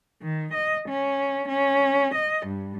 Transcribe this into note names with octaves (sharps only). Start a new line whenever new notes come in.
D#3
D#5
C#4
C#4
D#5
G2